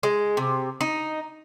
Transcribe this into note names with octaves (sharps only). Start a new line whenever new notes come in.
G#3
C3
D#4